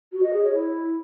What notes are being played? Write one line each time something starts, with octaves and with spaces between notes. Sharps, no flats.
F#4
D#5
G#4
C#5
E4